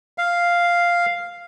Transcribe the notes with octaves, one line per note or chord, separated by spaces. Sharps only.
F5